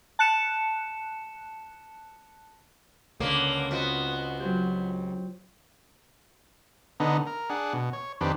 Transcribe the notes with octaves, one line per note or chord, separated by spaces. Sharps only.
A5 F#6 C#7 E7
C#2 D3 A#3 B3 C#5
B3 C4 F4 F#4 D#5
F#3 C4 G4
D3 B3 D#4
A#4
D4 G#4 F#5
B2
C#5
F2 D#3 D4 G4 B4 C5